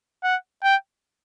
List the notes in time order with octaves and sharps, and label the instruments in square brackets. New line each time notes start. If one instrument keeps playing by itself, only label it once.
[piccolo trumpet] F#5
G5